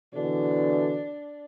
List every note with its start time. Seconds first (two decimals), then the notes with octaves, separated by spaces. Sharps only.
0.14 B2 D3 E3 D4